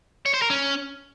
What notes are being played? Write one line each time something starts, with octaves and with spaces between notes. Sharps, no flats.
C#5
C5
A#4
C#4